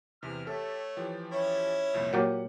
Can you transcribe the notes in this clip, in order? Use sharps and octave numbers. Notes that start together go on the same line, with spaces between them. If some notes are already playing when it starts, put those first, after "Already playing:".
E2 C3 E3 F6
A3 G4 A4 C#5 E5
E3 F3 G4
C#4 E4 C#5
C2 F2 A#2
A#2 F#3 G4 F#5